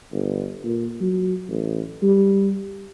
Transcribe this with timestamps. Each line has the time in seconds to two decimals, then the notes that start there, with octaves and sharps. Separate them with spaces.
0.12 G1
0.64 A#2
1.00 F#3
1.49 A1
2.02 G3